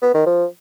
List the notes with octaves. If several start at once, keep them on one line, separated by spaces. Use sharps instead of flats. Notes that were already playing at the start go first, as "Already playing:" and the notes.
B3
D#3
F3